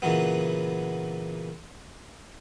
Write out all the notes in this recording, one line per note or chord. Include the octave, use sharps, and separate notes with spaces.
A#2 C#3 E3 F#3 B3